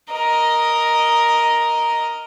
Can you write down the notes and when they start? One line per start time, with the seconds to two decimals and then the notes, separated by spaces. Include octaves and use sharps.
0.13 A#4 D#5